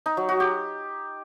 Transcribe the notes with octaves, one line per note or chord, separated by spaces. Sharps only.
D#4
F#3
F#4
G4